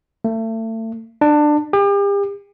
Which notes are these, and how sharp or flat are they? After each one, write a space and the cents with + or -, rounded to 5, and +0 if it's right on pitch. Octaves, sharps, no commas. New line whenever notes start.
A3 +30
D4 +20
G4 +40